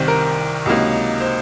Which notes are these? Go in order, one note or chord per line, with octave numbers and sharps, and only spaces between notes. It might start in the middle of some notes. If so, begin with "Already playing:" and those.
Already playing: C2 C3 D#3 C5
A#4
C#2 C3 F#3 A#3 D#4
C5